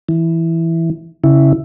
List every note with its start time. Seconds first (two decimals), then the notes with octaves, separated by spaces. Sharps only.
0.09 E3
1.24 C#3 E4